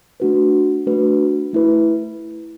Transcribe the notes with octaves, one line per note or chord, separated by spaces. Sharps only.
A3 D4 F#4 B4
A3 D4 F#4 B4
A3 E4 B4